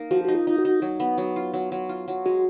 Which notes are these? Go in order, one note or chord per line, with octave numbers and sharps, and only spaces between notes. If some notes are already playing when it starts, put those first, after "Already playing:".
Already playing: A#3 D#4 A#4
F3 F#4
D#4 F#4
F4
D#4
F#4
D#4
F#3
B3
F#3
F4
F#3
F#3
F4
F#3
G#3 F#4